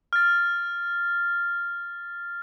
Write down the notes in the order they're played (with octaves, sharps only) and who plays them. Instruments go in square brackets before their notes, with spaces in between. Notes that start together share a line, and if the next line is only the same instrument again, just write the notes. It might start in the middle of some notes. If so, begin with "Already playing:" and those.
[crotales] F6 A6